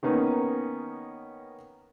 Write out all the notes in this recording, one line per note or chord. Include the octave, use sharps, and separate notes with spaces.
D#3 A#3 B3 C#4 D#4